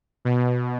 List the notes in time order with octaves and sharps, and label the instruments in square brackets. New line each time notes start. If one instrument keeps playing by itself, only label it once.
[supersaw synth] B2